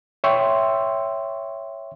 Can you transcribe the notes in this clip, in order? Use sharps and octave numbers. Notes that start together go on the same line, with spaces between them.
C#5 E5 G5 C6 C#6